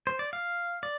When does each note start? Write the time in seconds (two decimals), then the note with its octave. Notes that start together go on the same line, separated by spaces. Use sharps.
0.07 C5
0.19 D5
0.33 F5
0.83 D5